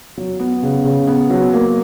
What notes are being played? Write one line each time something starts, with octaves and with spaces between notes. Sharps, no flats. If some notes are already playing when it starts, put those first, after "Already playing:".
F#3
B3
C#3
C#3
B3
F#3
A#3